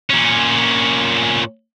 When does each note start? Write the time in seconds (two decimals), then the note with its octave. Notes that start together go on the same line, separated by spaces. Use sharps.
0.10 A#2 C#4